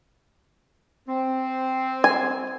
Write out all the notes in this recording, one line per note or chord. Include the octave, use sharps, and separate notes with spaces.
C4
G#5